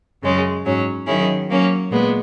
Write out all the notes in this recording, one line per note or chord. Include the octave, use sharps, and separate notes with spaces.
F#2 C#3 G#3 C#4
G#2 F#3 C#4
D#3 F#3 C#4 E4 G#4
F#3 A#3 C#4
A#2 G#3 B3